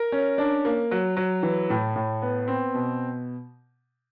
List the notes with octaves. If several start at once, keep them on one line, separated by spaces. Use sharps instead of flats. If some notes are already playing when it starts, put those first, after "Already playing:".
Already playing: A#4
C#4
D4
A#3
F#3
F#3
E3
A2
A2
B3
C4
B2